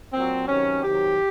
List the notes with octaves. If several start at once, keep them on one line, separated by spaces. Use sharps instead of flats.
A#2 F#3 C4
C3 D#3 F#3 C#4
C3 D#3 F#3 G4